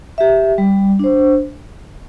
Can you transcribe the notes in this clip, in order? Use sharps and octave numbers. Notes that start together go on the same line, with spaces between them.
G4 E5
G3
D4 C5